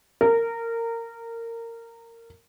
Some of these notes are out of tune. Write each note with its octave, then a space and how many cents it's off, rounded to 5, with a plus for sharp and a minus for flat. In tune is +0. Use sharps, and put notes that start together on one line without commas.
A#4 -20